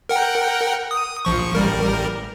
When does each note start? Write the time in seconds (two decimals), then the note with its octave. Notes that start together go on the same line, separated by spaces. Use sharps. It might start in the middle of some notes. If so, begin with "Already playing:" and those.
0.09 A#4 F#5 G5
0.91 D#6
1.25 A#1 F3 C#6
1.55 A1 G3 A#4